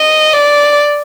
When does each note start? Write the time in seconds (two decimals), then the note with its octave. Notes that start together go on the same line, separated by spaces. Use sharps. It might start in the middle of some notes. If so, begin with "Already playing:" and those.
Already playing: D#5
0.33 D5